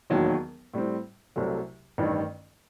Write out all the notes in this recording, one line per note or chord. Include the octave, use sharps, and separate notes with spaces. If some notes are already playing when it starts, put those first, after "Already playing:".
E1 D#2 D#3 F#3
A2 G3 C4
C2 C3 F#3 A3
A1 G2 D#3